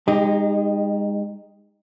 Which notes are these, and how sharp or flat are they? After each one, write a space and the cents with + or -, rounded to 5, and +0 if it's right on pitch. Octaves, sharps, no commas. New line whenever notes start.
G#3 -30 D#4 -5 G4 +10